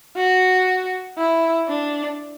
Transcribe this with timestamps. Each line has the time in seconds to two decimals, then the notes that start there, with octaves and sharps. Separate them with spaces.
0.16 F#4
1.18 E4
1.68 D4